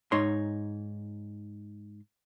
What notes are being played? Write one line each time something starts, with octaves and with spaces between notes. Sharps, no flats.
G#2 D#4 C#5 C6